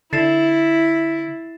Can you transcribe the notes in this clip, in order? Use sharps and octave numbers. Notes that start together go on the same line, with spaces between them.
D3 E4 A6 C7 E7